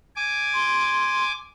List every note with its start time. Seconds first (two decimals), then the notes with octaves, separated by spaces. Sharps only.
0.16 G#5 D6
0.53 C6